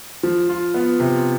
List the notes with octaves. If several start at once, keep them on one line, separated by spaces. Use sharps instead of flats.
F3
F4
B3
C3